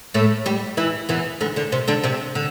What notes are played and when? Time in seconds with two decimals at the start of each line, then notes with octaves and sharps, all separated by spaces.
0.14 A2 A3
0.46 G3 G4
0.77 E3 E4
1.09 E2 E3
1.41 D2 D3
1.56 D3 D4
1.72 C3 C4
1.88 D3 D4
2.03 C3 C4
2.35 D3